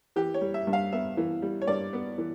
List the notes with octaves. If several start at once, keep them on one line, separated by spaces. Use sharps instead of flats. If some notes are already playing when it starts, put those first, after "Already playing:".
E3 G4
C#5
G3
E5
G2
F5
B3 E5
E3
G3
C#5
G2 D5
B3
E3